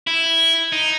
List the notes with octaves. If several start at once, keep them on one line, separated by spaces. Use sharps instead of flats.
E4
D#4